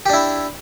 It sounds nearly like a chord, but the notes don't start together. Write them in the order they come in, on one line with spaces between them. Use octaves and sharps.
G4 D4 E4